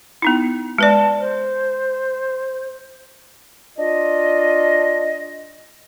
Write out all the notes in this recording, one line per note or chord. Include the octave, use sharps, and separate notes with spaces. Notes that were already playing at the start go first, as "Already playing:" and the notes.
B3 D#4 E4
G#3 B4 D5 A5
C5
D4 F4 D#5